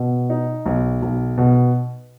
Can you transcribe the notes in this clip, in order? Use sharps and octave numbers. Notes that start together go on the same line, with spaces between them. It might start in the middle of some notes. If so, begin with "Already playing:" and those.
Already playing: B2
D#4
B1
B1
B2